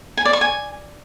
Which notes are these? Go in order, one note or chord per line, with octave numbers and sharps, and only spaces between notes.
G#5
D5
C#6
G#5